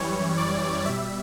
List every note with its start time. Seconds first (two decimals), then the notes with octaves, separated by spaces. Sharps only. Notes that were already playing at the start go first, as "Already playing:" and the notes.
Already playing: F#2 E3 G3 C#5
0.37 D5
0.85 B2 G3 E5